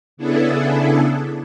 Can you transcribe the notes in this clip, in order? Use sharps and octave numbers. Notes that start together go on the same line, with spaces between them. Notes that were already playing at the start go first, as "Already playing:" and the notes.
C#3 B3 D4 E4 G#4 A4